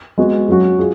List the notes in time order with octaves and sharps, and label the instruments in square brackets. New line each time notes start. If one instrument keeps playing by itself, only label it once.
[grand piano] G#3 B3 F#4
F#3 C#4 F#4
F4 G#4